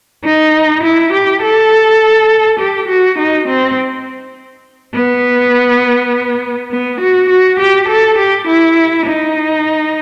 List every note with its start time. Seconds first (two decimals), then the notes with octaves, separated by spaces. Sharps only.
0.24 D#4
0.83 E4
1.13 G4
1.42 A4
2.60 G4
2.89 F#4
3.19 D#4
3.48 C4
4.95 B3
6.71 B3
7.01 F#4
7.30 F#4
7.60 G4
7.88 A4
8.18 G4
8.47 E4
9.06 D#4